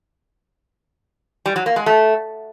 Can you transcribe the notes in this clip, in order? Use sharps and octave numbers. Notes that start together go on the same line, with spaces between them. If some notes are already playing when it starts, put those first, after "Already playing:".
G3
F#3
A#3
G#3
A3